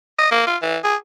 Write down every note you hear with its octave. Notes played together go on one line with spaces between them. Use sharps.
D#5
A#3
F4
E3
G#4